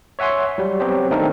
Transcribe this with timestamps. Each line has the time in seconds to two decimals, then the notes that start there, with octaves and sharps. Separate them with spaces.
0.19 C#5 E5 F#5 G#5 C6
0.58 F#3 G3
0.80 F#3 B3 C4 F#4 G4 C5
1.11 D#3 A3 C4 D4 D#4 A#4